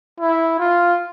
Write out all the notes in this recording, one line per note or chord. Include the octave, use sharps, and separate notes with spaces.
E4
F4